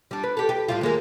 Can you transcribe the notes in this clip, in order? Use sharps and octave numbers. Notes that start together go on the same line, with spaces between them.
G3 D4
B4
G4 A4
G4
A2 G3 F4
D#2 G#3 A#3